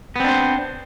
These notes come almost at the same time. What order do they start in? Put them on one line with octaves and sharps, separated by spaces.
B3 C4 D4 C5